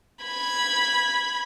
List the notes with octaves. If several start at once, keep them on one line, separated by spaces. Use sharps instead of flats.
B5 G#6